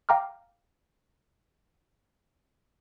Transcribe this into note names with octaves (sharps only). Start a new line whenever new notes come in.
F5 G5 A#5 D6 F6